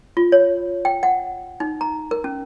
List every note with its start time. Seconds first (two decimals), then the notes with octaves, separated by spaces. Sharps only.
0.17 F4
0.32 C#5
0.85 G5
1.03 F#5
1.60 D#4
1.81 A#5
2.11 A#4
2.24 C#4